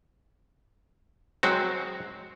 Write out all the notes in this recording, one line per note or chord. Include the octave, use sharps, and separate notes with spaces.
F#3 G#3 C4 F#4